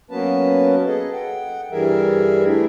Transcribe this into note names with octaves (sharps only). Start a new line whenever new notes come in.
F#3 A#3 B3 C#4 B4 A5
G#4 A4 D#5
F#5 G5
G2 E3 G3 G#4 A#4 E5
A3 D4 E4 G#4